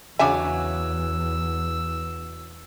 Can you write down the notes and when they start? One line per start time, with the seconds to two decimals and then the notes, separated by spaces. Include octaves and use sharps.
0.19 E2 C#3 F#3 G#3 D4 E5 G#5 E6